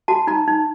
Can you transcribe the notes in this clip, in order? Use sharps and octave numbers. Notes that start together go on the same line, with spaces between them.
F#4 A5
D#4 A#5
D#4